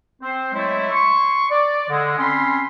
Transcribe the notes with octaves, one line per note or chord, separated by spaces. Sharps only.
C4 C5
F#3 G#3 A3 E4
C6 C#6
D5
D3 G#3
C4 C#4 B5 C6